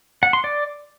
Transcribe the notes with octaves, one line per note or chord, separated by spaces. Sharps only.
F#5
C6
D5